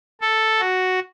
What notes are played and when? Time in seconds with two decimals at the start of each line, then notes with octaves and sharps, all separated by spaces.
0.21 A4
0.60 F#4